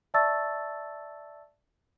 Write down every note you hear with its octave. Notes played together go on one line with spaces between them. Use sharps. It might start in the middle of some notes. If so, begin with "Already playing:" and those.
D5 E5 A5 C#6 E6 A6